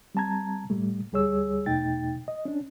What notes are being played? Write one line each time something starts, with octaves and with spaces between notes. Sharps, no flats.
G3 C4 A5 A#5 G#6
A2 G3 A3
D2 G3 G#4 C#5 E6
E2 B2 A3 D#4 G5 A6
D#5
C#4 D4